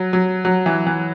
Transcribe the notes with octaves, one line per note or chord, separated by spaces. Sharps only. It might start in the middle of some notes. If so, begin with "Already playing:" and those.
Already playing: F#3
F#3
F#3
E3
E3